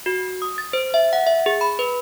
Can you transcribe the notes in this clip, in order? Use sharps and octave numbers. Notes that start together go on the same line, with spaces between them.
F#4
D#6
A6
C5
E5
F#5
E5
G#4
B5
B4